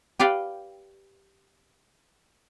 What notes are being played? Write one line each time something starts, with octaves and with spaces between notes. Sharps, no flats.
G4 B4 D5 F5 G5